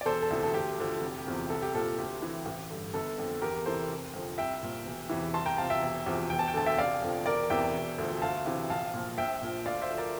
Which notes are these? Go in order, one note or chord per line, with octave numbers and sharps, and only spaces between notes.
D5
E1 A4 C5
A4
D2 C3 E3
A4
D2 G4
D3 F3
F1
E2 C3 F3
C2 A4
G4
A#2 F3 A4
D2 G4
C3 E3
A1
G2 D3
G1 A4
F2 D3
E2 G4 A#4
C3 E3 A4 C5
F1
F2 D3 F3
C2 E5 G5
A#2 F3
E1
E2 C3 E3
C2 A5 C6
G5 A#5
C3 F3 F5 A5
E5 G5
E1
E2 C3 F3
E1 G5
A5
G5
D2 D3 A5
E5 G5
F1 D5 F5
F2 D3 F3
E1 A#4 D5
E2 C3 E3 E5 G5
E1
D2 D3 F3
D2 F5 A5
C3 E3
A#1 F5 A5
A#2 F3
A#1 E5 G5
A#2 F3
D2 D5 F5
C5 E5
D3 F3
A#4 D5